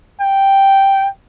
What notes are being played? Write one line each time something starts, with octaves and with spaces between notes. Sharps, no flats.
G5